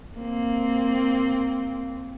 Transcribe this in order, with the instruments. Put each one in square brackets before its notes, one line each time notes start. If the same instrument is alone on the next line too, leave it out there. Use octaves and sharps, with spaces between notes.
[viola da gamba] A#3 C4